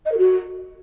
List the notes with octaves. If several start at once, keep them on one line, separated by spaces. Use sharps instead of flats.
D#5
A#4
F#4